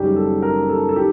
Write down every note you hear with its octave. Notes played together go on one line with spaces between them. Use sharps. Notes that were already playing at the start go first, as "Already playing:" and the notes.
Already playing: F#1 F#2 D#3 G3 G4
A4
A#4
A4
A4
D#3 G4